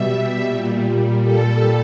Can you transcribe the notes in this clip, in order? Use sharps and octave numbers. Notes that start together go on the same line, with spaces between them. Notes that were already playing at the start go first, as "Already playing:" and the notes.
Already playing: B2 G3 E5
A#2 G3
A4